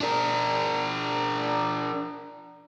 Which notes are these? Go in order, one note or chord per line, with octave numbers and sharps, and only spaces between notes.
D4 A#4